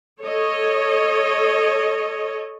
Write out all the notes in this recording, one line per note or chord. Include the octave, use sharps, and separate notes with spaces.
A4 C#5 D#5